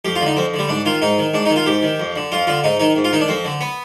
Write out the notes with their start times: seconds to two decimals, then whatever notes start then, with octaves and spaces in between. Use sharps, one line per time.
0.05 F2 G4
0.15 F4
0.21 D3
0.26 D#4
0.37 F2 C4
0.54 D3
0.59 G3
0.69 G#2 D4
0.85 D#3 F4
1.02 G#2 D#4
1.18 D#3
1.34 G#2 D4
1.45 D#4
1.50 D#3
1.56 F4
1.66 G#2 G4
1.82 D#3
2.00 F2
2.16 D3
2.32 F2 F4
2.47 D3 F4
2.64 G#2 D#4
2.79 D#3 D#4
2.96 G#2
3.04 F4
3.13 D#3 D#4
3.21 D4
3.28 F2 C4
3.45 D3
3.61 B3